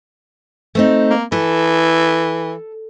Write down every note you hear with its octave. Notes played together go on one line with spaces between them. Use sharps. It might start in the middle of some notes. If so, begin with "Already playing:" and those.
A3 C4 D#4
A#3
E3 A4